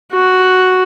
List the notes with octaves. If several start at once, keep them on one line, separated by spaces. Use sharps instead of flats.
F#4